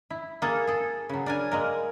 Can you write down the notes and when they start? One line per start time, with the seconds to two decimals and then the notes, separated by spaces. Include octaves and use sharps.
0.10 E4
0.42 A#3 G#4 A4
0.67 G#4 A4
1.09 C#3 F#3
1.26 D4 A#4 G#5
1.52 G#3 A#3 A#4